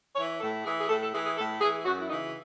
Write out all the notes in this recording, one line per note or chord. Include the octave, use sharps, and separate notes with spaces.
E3 C#5
A2 A4
E3 G#4
G#4
A2 A4
A4
E3 G#4
G#4
A2 A4
E3 G#4
F#2 F#4
E4
C#3 E3 D#4